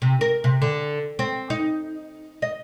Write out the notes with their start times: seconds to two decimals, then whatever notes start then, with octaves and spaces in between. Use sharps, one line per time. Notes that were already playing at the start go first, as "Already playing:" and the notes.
0.02 C3
0.21 A#4
0.44 C3
0.62 D3
1.19 C4
1.50 D#4
2.42 D#5